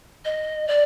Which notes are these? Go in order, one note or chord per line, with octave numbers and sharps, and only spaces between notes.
D#5
D5